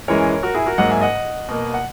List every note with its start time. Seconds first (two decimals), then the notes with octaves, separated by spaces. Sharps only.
0.08 F#2 E3 G#3 A#4 C#5
0.43 F#4 A#4
0.54 E4 G#4
0.66 F#4 A#4
0.78 G#2 F#3 A#3 D#5 F#5
0.90 E5 G#5
1.01 D#5 F#5
1.49 B2 A#3
1.74 F#5